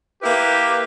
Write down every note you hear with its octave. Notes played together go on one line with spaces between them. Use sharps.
A#3 E4 G4 B4